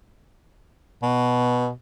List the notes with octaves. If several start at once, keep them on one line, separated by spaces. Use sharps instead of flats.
B2